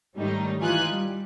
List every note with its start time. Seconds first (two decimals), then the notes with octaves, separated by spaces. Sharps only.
0.15 G#2 D#3 G3 A3 C#4 D#4
0.58 E3 D#4 F4 G#5 F#6
0.90 G3